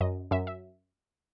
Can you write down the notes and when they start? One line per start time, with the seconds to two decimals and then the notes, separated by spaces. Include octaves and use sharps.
0.01 F#2 D#5
0.31 F#2 E5
0.47 E5